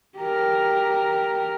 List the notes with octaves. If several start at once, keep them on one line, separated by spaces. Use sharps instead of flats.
G4 A#4